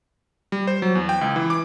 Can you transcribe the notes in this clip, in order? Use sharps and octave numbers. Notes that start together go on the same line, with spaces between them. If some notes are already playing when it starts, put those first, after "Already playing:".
G3
C5
F#3
E2
G5
C#2
E3
D6